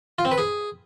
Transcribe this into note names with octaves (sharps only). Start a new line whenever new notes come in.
F4
C4
B4
G#4